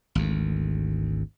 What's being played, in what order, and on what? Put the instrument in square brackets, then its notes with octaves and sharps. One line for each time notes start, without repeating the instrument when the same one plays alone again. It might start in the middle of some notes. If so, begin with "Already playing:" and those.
[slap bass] G#1 D2